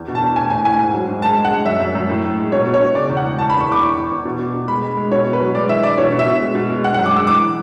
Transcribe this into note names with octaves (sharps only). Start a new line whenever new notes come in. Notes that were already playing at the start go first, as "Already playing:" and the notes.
Already playing: E2
B2
A5
E2
A2 G#5
A2 G#5
A2 G#5
G#2
F#3
G#2
G#3 A5
G#3
F#5
G#3
F#2 E5
F#2
F#2
A2
A2
G#3
B2 C#5
B2
C#5
B2
C#3 D5
E2
F#5
G#3
E2 A5
B5
E2
C#6
E2 D6
E2 C#6
E2
E2
B2
B2
B2
G#3 B5
G#3
G#3
B2 C#5
B2
B4
F#3
G#3 D5
E3 E5
E3 D5
B2 C#5
B2
E5
B2
G#3
B2
G#3
G#3 F#5
F#5
F#2
D6
G#3 E6
E3 D6
E3